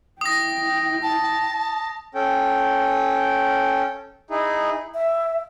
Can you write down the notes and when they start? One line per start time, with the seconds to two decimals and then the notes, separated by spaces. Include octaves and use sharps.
0.21 E4 G5 D#6 A#6
1.03 A5
2.15 C#4 A4 G5
4.30 D#4 E4 G#4
4.94 E5